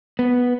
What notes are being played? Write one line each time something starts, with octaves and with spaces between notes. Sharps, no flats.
B3